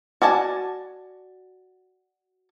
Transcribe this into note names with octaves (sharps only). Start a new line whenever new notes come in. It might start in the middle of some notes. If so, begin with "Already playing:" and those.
F#4 D5 G#5 A5